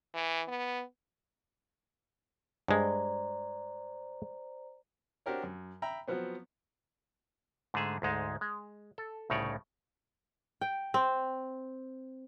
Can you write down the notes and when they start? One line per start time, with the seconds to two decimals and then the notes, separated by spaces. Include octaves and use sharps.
0.14 E3
0.48 B3
2.68 G2 G#3 C5 D5 A#5
5.26 C4 D4 F#4 G4 A#4 C#5
5.43 F#2
5.82 E5 G5 A#5 B5
6.07 F3 F#3 B3 C4
7.74 G#2 D3 A3 G#4 E5
8.02 D2 G#2 G#3 D#4
8.41 G#3
8.98 A4
9.30 C2 A2 C#3 D#4 C#5 D5
10.61 G5
10.94 C4